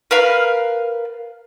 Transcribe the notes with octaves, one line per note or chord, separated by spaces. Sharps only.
A#4 B4 F5